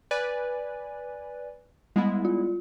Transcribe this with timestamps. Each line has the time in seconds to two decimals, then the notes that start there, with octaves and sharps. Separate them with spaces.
0.11 B4 D5 G#5
1.96 G3 G#3 B3 E4
2.25 F4